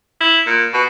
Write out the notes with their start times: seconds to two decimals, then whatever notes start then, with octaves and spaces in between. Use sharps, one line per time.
0.21 E4
0.47 A#2
0.73 B2